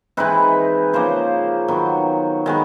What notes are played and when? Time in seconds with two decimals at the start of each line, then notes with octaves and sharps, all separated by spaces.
0.17 E3 G#3 C4 D#4 B4
0.93 C#3 F3 A#3 C5
1.68 D#3 F#3 B3
2.46 D#3 G#3 B3